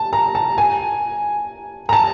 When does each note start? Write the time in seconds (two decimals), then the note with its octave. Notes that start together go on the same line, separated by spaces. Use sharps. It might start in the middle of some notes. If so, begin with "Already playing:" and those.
Already playing: A5
0.13 A#5
0.35 A5
0.58 G#5
1.89 A#5
1.93 A5